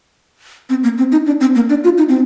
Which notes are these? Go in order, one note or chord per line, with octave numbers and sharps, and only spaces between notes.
C4
A#3
C4
D#4
D4
C4
A#3
D4
F4
D#4
C4